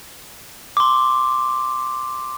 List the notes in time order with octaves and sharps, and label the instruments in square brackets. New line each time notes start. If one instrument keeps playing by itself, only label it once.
[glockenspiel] C6 D6